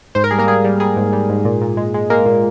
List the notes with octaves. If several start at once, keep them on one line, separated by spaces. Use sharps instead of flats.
G#2 C5
A#4
G3 G#4
A#3 A#4
G3 G#4
G3
G3 G#4
G#2
G3
G#2
A#2
A#2
G#3
G#3
G#3 A#3 A#4
A#2